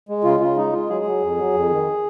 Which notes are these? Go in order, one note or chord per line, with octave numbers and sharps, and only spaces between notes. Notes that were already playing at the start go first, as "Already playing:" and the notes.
G#3
C#3 F4
C#3 F4
G#3 D#4
G#3 F4
F#3 G#4
F#3
F2
F#3
F2
D#3